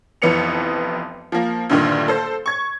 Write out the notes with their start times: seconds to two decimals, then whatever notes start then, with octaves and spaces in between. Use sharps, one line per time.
0.22 F1 F2 E3 B3 C#7 F7
1.32 F3 A#3
1.70 D2 G2 A#2 D3 D#3
2.08 A4 C5
2.46 C#6 G#6